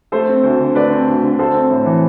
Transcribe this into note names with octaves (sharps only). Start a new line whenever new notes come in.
A3 A4 C5
C4
D2
D3
A3 B4 D5
C4
D2
D3
A3 A4 C5
C4
A2
E3